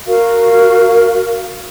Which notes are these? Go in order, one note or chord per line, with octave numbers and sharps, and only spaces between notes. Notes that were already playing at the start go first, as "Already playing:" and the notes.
F#4 A#4 F5